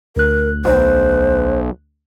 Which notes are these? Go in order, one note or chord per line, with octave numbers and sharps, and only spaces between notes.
D2 A#4 F#6
B1 C5